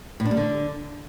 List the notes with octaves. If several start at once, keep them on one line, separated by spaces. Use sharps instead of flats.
A2
D4
G3
D3